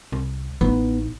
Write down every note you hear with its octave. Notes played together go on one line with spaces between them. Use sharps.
C2
A1 B3 D#4